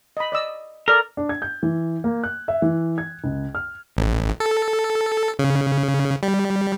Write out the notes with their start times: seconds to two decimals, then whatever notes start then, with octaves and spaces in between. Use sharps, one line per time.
0.17 D#5 B5
0.32 D5 D#5 E6
0.88 A4 A#4 D5
1.17 D4
1.29 G#6
1.42 G6
1.63 E3
2.04 A#3
2.24 F#6
2.48 E5
2.62 E3
2.98 G#6
3.24 C#2
3.55 F6
3.97 A1
4.40 A4
5.39 C#3
6.23 G3